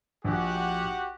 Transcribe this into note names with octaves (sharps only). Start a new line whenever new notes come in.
A#1 F#4 G4 F#5